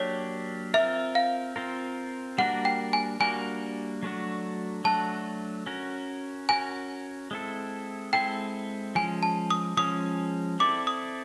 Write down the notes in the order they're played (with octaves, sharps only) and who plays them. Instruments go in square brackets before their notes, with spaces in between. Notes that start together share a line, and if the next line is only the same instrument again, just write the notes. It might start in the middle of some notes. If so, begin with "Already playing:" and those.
Already playing: [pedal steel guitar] F#3 A#3 D4 G4 [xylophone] C#5
[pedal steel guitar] C4 F4 A#4 [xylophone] E5
[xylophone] F5
[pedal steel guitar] C4 F4 A#4
[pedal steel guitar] G3 A#3 D4 F#4 A#4 [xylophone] F#5
[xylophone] G5
G#5
[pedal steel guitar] G3 A#3 D4 F#4 A#4 [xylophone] G#5
[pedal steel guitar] F#3 A3 D4 F#4
[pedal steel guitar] F#3 A3 D4 F#4 [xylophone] A5
[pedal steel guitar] C#4 F#4 A#4
[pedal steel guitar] C#4 F#4 A#4 [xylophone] G#5
[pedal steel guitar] G#3 C4 E4 A4
[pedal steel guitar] G#3 C4 E4 A4 [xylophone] G5
[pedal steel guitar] F3 G#3 C#4 [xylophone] G#5
[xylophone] A5
D#6
[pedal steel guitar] F3 G#3 C#4 [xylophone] D#6
[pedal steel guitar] C4 E4 A4 D5 [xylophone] D6
[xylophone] D#6